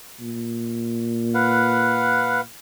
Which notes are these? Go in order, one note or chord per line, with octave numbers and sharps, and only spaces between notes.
A#2
B4 F5 F#5